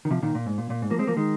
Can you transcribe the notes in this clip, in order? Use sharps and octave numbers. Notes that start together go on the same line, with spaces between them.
D#3
C3 F3
A#2 D#3
A#2
G#2
A#2
A#2
G#2
F3 A#3
G#3 C4
F3 A#3
D#3 G#3